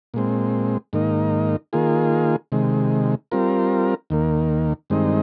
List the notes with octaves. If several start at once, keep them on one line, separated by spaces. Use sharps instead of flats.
A#2 G#3 C4
G#2 D#3 A#3 D#4
D#3 A#3 F4 G#4
C3 D#3 G#3
G3 C4 F4 A#4
D#2 D#3 A#3
G2 D#3 G#3 C4 D#4